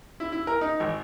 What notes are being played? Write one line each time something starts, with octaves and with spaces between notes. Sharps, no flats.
E4
E4
A#4
D#4
G#1